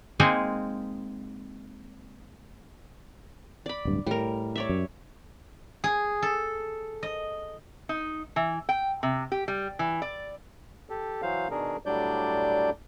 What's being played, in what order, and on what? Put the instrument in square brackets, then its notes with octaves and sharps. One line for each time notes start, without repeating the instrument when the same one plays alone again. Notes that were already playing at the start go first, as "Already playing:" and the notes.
[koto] G#3 A#3 C4 D#4 G#4
[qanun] D5 B5
[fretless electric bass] D1 G2
[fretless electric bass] A2 [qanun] G3 A#4
[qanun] C#5 D5 E5
[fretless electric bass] F#2
[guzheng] G#4
A4
D#5
[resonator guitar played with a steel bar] D#4
E3
G5
C3
G4
G3
E3
D5
[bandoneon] G4 A4
E3 F#3 C5 F5
B2 D#3 D4 G#4 A#4
A2 F#3 G3 D4 D5 G6